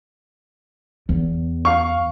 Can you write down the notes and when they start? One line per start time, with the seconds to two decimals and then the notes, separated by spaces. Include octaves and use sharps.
1.09 E2
1.65 F5 C#6